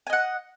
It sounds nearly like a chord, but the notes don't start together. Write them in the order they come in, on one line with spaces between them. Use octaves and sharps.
G#5 D#5 F#5